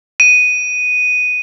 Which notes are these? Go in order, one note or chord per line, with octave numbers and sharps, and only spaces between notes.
D#7